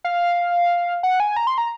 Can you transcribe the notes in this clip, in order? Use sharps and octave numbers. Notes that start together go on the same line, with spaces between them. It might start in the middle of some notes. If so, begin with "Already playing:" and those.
F5
F#5
G#5
A#5
C6
A#5